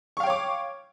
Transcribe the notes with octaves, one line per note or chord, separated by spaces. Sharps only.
C#5 F5 G5 C#6 D6